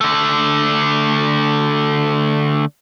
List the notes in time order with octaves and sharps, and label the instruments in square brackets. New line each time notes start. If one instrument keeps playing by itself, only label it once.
[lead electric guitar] D3 A3